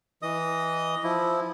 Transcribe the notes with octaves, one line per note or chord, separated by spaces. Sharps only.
E3 D#5 D#6
F3 E4